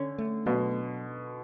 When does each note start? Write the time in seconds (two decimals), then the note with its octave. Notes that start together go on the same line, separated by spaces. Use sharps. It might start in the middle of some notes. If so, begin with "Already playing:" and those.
Already playing: D3 C#4
0.18 A3
0.46 B2 F#3